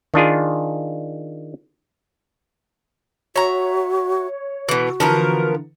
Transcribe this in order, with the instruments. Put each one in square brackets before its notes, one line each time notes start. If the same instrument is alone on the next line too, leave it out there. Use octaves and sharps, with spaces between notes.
[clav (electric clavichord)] D#3 D4 F4 G#4
[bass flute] F#4 [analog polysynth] C#5 [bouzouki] E5 A#5
[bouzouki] B2 E3 [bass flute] F#4
[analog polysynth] D3 E3 [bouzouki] F3 B3 A#4